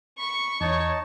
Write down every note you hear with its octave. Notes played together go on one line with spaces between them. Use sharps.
B5 C#6
E2 D#4 C#5 A5